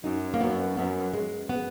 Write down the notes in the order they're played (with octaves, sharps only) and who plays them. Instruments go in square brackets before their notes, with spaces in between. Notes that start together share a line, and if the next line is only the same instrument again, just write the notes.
[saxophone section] F#2 [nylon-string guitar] D#4
[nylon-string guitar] A#3
[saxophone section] F#2 [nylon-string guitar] B3
[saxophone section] F#2 [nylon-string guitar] B3
[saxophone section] F#2 [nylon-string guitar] G#3
[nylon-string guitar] B3